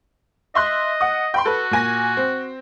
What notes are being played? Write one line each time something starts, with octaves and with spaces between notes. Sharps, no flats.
D#5 E5 C6 F#6
F#5 D#6
G5 B5 C6
F#4 A4 B4
A#2 G#5 A#6
C4